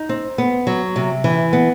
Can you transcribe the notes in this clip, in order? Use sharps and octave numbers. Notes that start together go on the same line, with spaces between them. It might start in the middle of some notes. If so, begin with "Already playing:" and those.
Already playing: D#4
C4
B3
F#3
C3
E3
B3